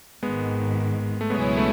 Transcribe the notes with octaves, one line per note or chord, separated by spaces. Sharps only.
G#1 G#2 D#3 G#3 B3
A3
C#2 B2 F#3 G#3 B3 C#4 E4
A3